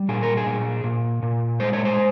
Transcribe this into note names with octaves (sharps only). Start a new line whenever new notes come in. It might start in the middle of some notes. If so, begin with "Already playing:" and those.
Already playing: G3
A#2 G#4
A#4
G#4
A#2
A#2
A#2
G#3 C5
C#5
C5